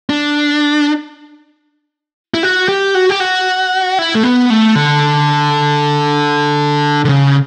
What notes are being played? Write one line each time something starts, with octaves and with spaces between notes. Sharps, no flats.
D4
E4
F#4
G4
F#4
G4
F#4
E4
A3
B3
A3
D3
D3
C#3